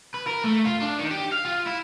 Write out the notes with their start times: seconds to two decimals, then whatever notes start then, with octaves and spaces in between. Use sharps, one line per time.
0.14 B4
0.27 A#4
0.44 A3
0.65 F4
0.81 D4
0.99 D#3
1.11 G4
1.32 F5
1.45 F4
1.66 E4